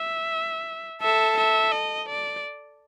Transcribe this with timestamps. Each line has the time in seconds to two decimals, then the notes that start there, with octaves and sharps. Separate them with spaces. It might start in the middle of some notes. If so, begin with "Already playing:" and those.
Already playing: E5
1.02 A4 E5
1.37 E5
1.72 D#5
2.08 D5